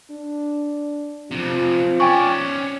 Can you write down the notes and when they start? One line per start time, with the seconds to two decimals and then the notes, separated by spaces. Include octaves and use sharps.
0.11 D4
1.31 F2 C3 F3
2.00 C#4 D5 G5 G#5 C#6